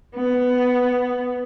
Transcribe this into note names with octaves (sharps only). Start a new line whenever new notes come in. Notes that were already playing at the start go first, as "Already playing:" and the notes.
B3